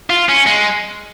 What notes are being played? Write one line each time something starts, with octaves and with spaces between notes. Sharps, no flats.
F4
C#4
G#3